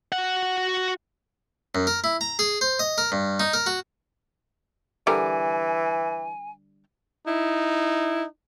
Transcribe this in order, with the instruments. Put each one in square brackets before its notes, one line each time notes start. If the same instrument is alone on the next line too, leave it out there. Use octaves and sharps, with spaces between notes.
[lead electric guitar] F#4 F#5
[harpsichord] F#2
A#4
E4
A#5
G#4
C5
D#5
A#4
G2
D#4
A#4
F#4
[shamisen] D3 G3 A#4 [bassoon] E3 [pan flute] G#5
[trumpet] D#4 [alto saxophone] E4